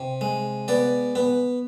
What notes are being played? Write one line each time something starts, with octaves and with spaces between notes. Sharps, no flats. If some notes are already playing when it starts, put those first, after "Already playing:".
Already playing: C3
G#3
B3 D5
B3